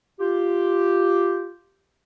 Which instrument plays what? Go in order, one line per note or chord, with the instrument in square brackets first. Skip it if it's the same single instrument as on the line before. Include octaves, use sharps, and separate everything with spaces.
[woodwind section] F4 G4